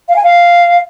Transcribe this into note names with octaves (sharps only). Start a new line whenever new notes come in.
F5
G#5
F5